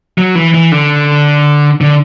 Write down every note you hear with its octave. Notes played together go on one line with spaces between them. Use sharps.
F#3
E3
E3
D3
D3